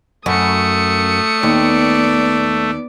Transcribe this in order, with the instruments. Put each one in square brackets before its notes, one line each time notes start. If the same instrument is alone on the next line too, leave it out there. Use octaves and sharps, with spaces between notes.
[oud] F#2 [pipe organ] A3 [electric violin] D#6 C#7
[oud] D#2 [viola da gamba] B3 D5